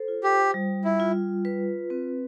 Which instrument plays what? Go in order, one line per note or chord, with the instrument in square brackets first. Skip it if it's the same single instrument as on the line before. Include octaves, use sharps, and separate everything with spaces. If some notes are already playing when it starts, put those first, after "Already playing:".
Already playing: [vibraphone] A4 C5
F4
[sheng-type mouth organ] G4
[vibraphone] G3
[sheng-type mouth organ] E4
[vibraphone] F4
B4
C4